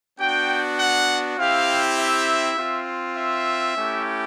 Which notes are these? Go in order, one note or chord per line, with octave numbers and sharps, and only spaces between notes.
B3 D4 F#4 G5
F#5
C4 E4 G4 F5
E5
C4 F4
E5
A3 C#4 E4 G4